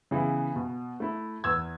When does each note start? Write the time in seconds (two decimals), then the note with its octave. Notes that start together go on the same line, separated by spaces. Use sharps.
0.11 C#3 E3 B3 E4
0.56 B2
1.00 A3 E4
1.44 E2 E6 G#6